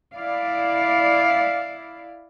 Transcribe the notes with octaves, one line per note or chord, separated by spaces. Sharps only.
E4 D5 F5